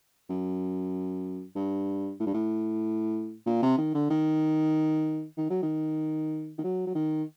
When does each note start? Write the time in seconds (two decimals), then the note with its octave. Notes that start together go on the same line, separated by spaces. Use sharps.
0.29 F#2
1.56 G2
2.20 A2
2.26 G2
2.34 A2
3.46 A#2
3.62 C3
3.78 D#3
3.94 D3
4.10 D#3
5.37 D#3
5.50 F#3
5.62 D#3
6.58 D#3
6.64 F#3
6.87 F#3
6.95 D#3